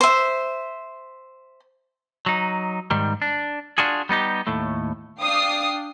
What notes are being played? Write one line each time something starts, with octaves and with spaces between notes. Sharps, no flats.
C5 E5
F#3 D#4
G#2 D#3 G3
D4
D4 F4 F#4 G#4
G3 B3 D#4 G4
D#2 A2 A3
D4 F5 G5 D#6 C7